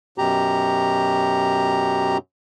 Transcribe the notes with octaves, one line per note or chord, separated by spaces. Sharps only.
F#2 B2 G4 A#5